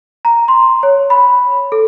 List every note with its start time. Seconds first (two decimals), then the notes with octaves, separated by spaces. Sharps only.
0.25 A#5
0.48 C6
0.83 C#5
1.10 B5
1.72 A4